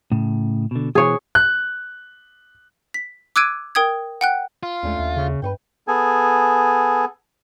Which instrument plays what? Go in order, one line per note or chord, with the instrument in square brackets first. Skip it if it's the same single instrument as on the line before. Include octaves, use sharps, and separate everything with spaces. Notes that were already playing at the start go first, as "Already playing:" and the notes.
[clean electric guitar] A2 C#3
B2 D3
[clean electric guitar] B2 E3 [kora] G#4 C#5
[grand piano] F#6
[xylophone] B6
D6 E6 F#6 G#6 D7 D#7
A#4 G5 D#6 G#6
F#5 G5 F#6
[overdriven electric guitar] F4
[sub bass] D#2 [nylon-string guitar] A3 C#4 D4
[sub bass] D#2
[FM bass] C#3
[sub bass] G2 [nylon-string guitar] B4 C#5 G5
[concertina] B3 G#4 A4 G#5